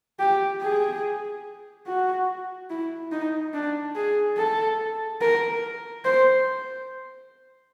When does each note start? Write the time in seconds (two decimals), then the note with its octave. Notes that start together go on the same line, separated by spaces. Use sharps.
0.19 G4
0.62 G#4
1.87 F#4
2.70 E4
3.12 D#4
3.54 D4
3.95 G#4
4.37 A4
5.21 A#4
6.05 C5